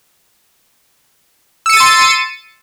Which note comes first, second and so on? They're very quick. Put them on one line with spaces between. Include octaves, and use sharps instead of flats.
E6 C#7 D#7 A6 C6